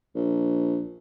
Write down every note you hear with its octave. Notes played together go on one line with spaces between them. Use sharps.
A#1